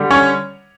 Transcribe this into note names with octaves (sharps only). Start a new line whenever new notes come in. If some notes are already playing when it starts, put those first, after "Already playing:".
Already playing: D3 G3
C#4 C#5